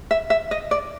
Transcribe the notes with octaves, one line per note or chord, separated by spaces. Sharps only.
E5
E5
D#5
D5